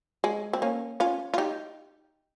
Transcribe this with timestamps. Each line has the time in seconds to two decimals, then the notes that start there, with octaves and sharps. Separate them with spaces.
0.24 G#3
0.53 C4
0.62 A#3 C#4
1.00 C#4 F4
1.34 F4
1.38 D#4 G4